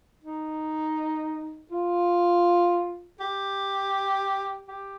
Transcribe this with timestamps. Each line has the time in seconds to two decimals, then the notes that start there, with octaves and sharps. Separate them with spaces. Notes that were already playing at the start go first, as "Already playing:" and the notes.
0.24 D#4
1.71 F4
3.20 G4
4.68 G4